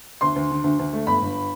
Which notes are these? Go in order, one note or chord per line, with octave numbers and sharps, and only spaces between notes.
D2 C6
D2
D3
D2
D2
A3
G1 B5
G1